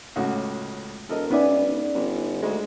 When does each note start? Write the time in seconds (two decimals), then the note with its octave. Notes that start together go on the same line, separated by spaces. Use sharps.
0.16 C#2 A2 F#4
1.09 E1 A4 A#4 D#5
1.31 B3 C#4 D#4 D5 E5 G#5
1.95 G1
2.42 D2 G#3